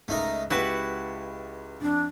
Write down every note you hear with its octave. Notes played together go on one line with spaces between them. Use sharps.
C#2 A3 D#4 A#4
C#2 E4 F#4 G4 B4 A5 B6
F2 D4